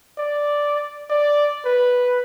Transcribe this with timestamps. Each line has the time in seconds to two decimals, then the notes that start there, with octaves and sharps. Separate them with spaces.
0.18 D5
1.10 D5
1.65 B4